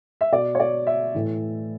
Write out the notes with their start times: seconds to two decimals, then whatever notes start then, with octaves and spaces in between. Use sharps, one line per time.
0.21 E5
0.32 B2 D5
0.55 C#5
0.60 D5
0.87 E5
1.15 A2 E3